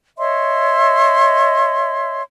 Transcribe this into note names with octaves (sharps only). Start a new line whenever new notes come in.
C#5 D#5 E5 C6